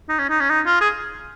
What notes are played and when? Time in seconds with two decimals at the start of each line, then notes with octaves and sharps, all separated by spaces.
0.09 D#4
0.19 C#4
0.30 D#4
0.40 C#4
0.50 D#4
0.66 F4
0.81 G#4